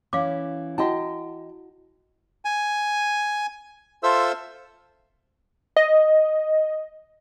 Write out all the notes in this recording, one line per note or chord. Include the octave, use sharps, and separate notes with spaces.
E3 C#4 F5 D6
E4 F#4 D#5 F#5 G5 A5
G#5
F4 A4 C5 E5 E6
D#5